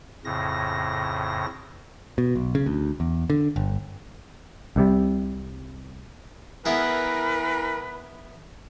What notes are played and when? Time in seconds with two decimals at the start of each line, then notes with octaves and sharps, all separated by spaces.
0.25 F2 A2 C#3 A#6
2.18 B2
2.35 B1
2.55 C#3
2.66 D2
3.00 E2
3.30 D3
3.56 G1
4.76 C2 C3 G3
6.66 E3 B3 E4 G#4 A#4 B4